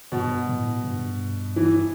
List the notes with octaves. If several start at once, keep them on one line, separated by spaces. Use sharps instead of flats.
G2 B2
A2
G2
E3